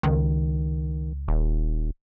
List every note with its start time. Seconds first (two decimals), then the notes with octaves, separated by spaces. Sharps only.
0.03 C#2 D#3
1.28 D#1